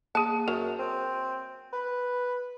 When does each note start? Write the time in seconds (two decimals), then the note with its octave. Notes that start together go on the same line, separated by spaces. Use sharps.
0.15 A#3 G#4 A5
0.48 F#2 F#3 A#4
0.79 C4
1.73 B4